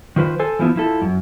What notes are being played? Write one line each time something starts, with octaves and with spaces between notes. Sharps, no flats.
D#3 F3 B4 C5
A4 C5 G#5
E3 F3 B3 E4
F3 E4 A4
F#2